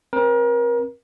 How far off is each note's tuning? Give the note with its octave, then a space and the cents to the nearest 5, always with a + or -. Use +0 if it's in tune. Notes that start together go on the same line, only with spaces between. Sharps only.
C4 +30 A#4 +35